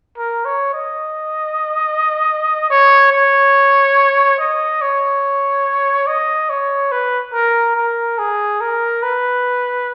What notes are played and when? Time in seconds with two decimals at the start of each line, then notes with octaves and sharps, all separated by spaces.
0.17 A#4
0.45 C#5
0.74 D#5
2.70 C#5
3.12 C#5
4.39 D#5
4.81 C#5
6.07 D#5
6.49 C#5
6.92 B4
7.33 A#4
7.76 A#4
8.18 G#4
8.61 A#4
9.02 B4